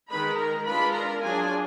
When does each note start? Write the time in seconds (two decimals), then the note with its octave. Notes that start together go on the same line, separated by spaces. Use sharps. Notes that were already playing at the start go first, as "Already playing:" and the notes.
0.10 D#3 G#3 D#4 B4 B5
0.39 A#4 A#5
0.67 G#3 D4 F4 B4 B5
0.95 A#4 A#5
1.24 F#3 D4 F4 G#4 G#5